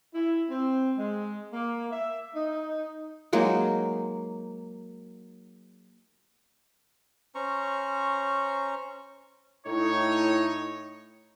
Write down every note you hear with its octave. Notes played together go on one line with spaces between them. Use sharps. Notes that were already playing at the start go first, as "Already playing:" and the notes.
E4
C4
G#3
A#3
E5
D#4
F#3 G#3 A#3 D#4
C#4 C5 A#5 C#6
A2 D#4 C#5